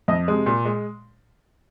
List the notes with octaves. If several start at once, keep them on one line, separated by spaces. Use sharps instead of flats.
F2 D#5
C3 G#3
A#2
G#3